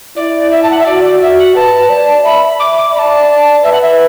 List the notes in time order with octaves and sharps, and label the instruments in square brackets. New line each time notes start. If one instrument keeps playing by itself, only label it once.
[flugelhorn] E4 [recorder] D5
[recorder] E5
A5
F#5
E5
[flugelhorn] F#4 [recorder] D5
[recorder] D5
[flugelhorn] F#4 [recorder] E5
[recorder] F#5
[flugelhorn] B4 [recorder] A5
[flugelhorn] D5
[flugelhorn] E5 [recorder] B5
[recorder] D6
D6
[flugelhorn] D5 [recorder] B5
[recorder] A5
[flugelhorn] B4 [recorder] E5
[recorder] F#5
E5